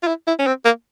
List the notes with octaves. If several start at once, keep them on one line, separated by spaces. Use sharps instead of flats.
F4
E4
E4
C#4
C4
A#3